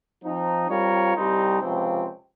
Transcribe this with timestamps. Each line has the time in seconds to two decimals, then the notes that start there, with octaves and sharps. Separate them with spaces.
0.23 F3 C4 D#4
0.69 G3 C4 F4 A#4 C#5
1.15 C2 C3 G3 C4 D#4
1.61 C#2 C3 F3 C4